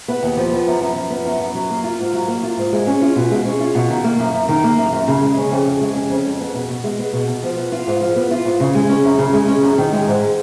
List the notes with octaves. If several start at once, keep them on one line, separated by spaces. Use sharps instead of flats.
B3
D#2
F3
B3
F#2
F#2
F3
B3
F#2
F#2
F#3
A#3
F4
G#2
F#3
A#3
F4
G#2
G#3
C#4
F4
B2
G#3
C#4
F4
B2
D#3
A#3
F#2
F#2
D#3
A#3
F#2
F#2
C#3
G#3
C#4
F2
C#3
G#3
C#4
F2
G#3
B3
B2
B2
G#3
B3
B2
B2
F3
B3
F4
G#2
F3
B3
F4
G#2
C#3
G#3
C#4
F#2
C#3
G#3
C#4
F#2
D#3
G#3
G#2